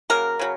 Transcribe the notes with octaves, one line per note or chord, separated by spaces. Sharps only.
C#3 F#3 A#3 A#4
C#3 F#3